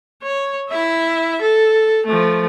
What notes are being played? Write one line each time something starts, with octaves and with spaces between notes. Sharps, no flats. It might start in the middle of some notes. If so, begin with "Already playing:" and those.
C#5
E4 E5
A4
F3 A3